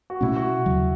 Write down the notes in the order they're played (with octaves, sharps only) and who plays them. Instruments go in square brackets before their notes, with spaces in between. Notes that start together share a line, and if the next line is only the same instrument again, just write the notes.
[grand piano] F#4
[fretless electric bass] B2 A3 C#4 [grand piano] E4
[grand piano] F#4
[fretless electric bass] D#2 C#3 F#3